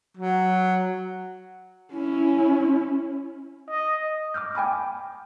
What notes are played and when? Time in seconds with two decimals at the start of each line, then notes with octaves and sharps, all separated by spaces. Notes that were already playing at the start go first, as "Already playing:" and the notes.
0.17 F#3
1.93 C#4 E4
3.70 D#5
4.34 D6 E6 F6 G6
4.55 G5 G#5 B5 D6